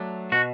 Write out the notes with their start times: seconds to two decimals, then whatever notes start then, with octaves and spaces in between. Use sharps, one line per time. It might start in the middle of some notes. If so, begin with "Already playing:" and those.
Already playing: F#3 A3 D4
0.32 B2 F#4